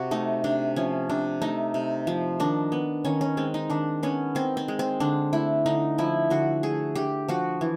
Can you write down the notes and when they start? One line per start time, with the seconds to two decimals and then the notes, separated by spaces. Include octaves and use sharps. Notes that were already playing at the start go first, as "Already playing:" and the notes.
Already playing: C3 F#4
0.11 A3 D#4
0.44 C3 D4
0.76 F3 C#4
1.10 C3 D4
1.42 A3 D#4
1.74 C3
2.07 F3
2.40 D#3 D4
2.72 B3
3.05 D#3 C#4
3.21 C#4
3.37 G#3 C4
3.54 D#4
3.70 D#3 D4
4.03 B3 C#4
4.35 D#3 C4
4.57 C4
4.68 G#3
4.79 C4
5.00 D3 D4
5.33 A3 E4
5.66 D3 D#4
5.98 F3 E4
6.30 D3 F#4
6.63 A3 G#4
6.95 D3 G4
7.28 F3 F#4
7.61 E3